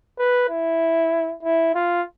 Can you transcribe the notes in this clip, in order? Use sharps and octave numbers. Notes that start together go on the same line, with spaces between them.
B4
E4
E4
F4